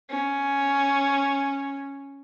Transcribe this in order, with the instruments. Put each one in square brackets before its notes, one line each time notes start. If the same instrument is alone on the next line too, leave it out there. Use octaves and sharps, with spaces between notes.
[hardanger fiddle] C#4